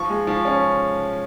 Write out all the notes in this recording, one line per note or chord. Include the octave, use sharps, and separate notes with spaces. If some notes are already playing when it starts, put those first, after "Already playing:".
Already playing: F3 C#6
G#3
F3
C#4